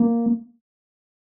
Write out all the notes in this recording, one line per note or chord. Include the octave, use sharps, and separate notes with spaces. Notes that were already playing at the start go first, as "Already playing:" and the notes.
Already playing: A#3